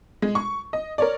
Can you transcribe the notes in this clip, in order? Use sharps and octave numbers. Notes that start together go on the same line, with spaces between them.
G#3
C#6
D#5
A#4 C#5 D5